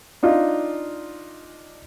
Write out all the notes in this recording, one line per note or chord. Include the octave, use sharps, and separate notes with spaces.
D4 D#4 F4